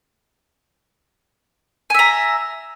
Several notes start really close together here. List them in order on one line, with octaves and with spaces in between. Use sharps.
G#5 E5 A#5